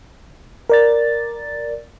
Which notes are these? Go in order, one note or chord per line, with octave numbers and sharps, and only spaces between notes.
A#4 D5 A6